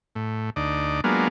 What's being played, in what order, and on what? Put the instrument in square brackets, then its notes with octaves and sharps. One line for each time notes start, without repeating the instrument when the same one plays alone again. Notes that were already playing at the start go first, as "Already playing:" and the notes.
[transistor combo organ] A2
D2 D#4 D5
F#3 G#3 A#3 B3 D4 F4